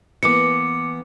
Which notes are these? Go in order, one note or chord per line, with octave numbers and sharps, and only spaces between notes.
E3 A#3 B3 D6 C#7